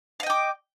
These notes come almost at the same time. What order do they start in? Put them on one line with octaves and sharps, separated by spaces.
F5 D#5 G5 D6